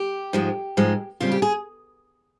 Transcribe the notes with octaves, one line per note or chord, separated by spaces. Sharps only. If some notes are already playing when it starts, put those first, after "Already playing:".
Already playing: G4
G#2 F3 G#3
G#2 F3 G#3
C#3 G3 C4 F4
G4
G#4